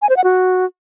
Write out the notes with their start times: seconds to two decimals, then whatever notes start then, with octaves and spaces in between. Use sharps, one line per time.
0.02 G#5
0.09 C5
0.17 F#5
0.24 F#4